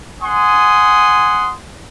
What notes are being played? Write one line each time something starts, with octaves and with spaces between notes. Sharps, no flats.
F#5 G#5 C6 D#6